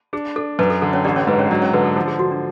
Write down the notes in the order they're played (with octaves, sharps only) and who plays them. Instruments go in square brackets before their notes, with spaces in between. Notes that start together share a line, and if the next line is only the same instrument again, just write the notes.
[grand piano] D4 [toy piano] G#4
[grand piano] D4 [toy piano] A4
[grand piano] F#2 [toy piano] B4
[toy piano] A4
[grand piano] D3 [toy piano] A4
[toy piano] C#4 C#5
[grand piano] A1 [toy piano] D4 D5
[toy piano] C#4 C#5
[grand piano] G#2 [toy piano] B4
[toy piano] C#4 C#5
[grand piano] F#3 [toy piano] D4 D5
[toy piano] C#4 C#5
[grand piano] D3 [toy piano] B4
[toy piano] A4
[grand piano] F3 [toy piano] A4
[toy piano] G#4
[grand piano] D3 [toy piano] F#4
[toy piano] D4